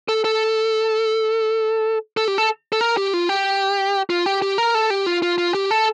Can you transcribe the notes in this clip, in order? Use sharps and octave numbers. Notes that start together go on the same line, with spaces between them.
A4
A4
A4
G4
A4
A4
A#4
G4
F4
G4
F4
G4
G4
A#4
A4
G4
F4
F4
F4
G4
A4